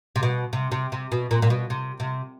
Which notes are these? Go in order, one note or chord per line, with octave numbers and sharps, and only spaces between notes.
C3
B2
C3
C3
C3
B2
A#2
A#2
B2
C3
C3